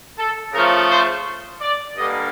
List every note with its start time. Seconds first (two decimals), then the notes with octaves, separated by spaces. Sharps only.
0.18 A4
0.53 C#3 F3 A3 A#4
0.90 C5
1.61 D5
1.96 G2 D3 G3 A#3 D#5